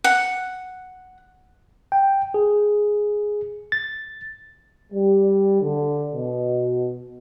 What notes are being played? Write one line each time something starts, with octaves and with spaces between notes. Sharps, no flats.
F#5
G5
G#4
A6
G3
D3
B2